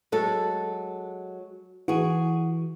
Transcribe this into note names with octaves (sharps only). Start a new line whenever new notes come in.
F#3 G#3 A4
E3 F#4 G#4